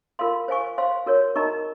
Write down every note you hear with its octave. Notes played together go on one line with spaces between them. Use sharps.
F4 A#4 F5 C6
C5 F5 G#5 C#6
C5 F5 C6
F#4 A#4 C#5
D#4 A#4 D#5 A#5 C#6